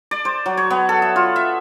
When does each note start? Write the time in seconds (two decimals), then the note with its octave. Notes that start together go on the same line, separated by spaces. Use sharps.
0.11 D5
0.25 C5
0.46 F#3
0.57 C#5
0.70 B3
0.89 A4
1.02 E5
1.16 F4
1.36 E5